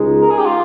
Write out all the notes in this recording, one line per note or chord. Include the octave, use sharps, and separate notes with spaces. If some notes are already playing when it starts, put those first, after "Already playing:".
Already playing: C#2 G#3 D#4
A#4
G#4
G4
F4